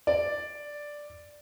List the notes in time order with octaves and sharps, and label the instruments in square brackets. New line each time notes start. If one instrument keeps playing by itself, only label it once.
[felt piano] D5